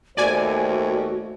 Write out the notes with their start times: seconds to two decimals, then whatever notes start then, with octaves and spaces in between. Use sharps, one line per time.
0.17 D#2 A3 F#4 C5 D5 G#5